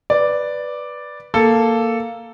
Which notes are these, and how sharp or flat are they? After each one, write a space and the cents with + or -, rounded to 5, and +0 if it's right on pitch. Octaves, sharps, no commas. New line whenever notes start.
B4 +0 D5 +0
A#3 -5 A4 +0